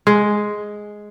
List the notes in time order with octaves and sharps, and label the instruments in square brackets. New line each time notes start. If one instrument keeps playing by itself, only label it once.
[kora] G#3